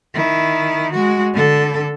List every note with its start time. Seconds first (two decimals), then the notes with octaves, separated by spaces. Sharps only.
0.14 D#3 E4
0.93 G#3 F#4
1.34 D3 A4